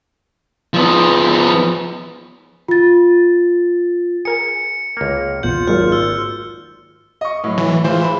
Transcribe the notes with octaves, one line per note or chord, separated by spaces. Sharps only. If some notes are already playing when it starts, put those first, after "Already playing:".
F3 B3
F4 A6
G#4 A#4 G#5 C#7
C#2 A#3
B1 E2 A#2 F4 F#5 G6
G#1 F#3 G#3 A#3 F6
E6
D#5 C#6
A2 F#3
E3
E3 G#3 F4 C5
B5